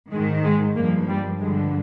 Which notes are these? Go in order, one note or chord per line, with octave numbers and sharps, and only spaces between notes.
G#2 D#3 G#3
G#3
G2 F3 A#3
G3
G2 D3 F3 G#3